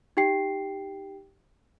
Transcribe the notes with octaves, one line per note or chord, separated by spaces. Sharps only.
D#4 G4 G5 C7